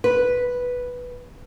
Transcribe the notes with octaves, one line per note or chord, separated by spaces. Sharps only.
B4